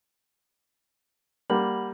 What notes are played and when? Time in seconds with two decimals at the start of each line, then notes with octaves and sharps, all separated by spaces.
1.50 G3 A#3 F#5 B5 F#7